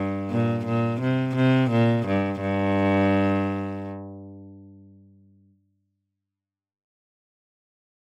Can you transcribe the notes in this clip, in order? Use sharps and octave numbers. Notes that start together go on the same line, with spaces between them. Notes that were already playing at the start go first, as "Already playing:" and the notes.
Already playing: G2
A#2
A#2
C3
C3
A#2
G2
G2